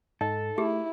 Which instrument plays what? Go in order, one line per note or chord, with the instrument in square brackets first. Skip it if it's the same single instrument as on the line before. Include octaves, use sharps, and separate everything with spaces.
[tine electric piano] G#2 [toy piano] D#4 D#5 [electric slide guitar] A4
[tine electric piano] A3 [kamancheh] E4 [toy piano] G4 G#4